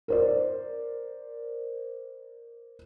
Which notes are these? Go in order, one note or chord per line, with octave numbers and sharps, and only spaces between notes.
A#4 C5 D5